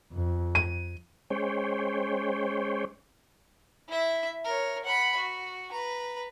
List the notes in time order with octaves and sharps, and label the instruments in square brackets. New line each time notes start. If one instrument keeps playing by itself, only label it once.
[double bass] F2
[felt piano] D#7
[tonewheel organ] G#3 C#4 C5 C#5 G5
[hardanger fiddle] E4 E5
A#4 C#5
F#5 B5
F#4
B4 A#5